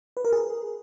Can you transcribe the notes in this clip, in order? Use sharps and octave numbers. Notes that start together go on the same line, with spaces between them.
B4
A#4
G#4